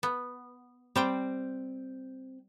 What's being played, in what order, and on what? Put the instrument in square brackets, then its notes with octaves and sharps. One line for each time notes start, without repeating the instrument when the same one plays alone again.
[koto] B3
[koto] G3 C5 G5 [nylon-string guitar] C4